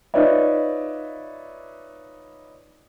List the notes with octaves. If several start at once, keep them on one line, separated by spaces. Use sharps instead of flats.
D#4 F4 B4 C#5 D5 E5